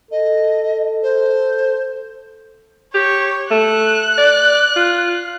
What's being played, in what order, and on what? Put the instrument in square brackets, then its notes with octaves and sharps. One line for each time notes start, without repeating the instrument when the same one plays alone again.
[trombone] A4 [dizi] D#5
[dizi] C5
[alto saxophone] G4 [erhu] C#5
[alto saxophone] A3 [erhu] F#6
[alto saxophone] D5
F4